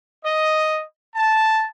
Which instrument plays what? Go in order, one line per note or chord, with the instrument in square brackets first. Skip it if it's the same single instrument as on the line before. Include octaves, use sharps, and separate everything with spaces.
[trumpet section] D#5
A5